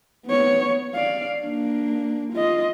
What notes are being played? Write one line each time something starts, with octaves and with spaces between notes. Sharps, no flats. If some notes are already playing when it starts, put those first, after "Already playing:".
B3 C#5
D5 F5
A#3 D4
F4 D#5